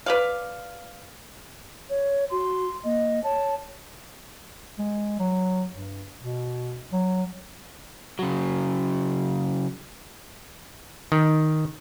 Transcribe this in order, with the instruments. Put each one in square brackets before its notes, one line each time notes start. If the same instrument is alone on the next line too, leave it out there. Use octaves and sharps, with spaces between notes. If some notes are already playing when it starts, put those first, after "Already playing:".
[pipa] B4 D5 F5
[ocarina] C#5
[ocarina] F#4 [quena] C6
[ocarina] A#3 [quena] D#5
[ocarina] C#5 [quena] A5
[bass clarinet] G#3
F#3
G2
B2
F#3
[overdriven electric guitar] C#3 F#3
[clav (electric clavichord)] D#3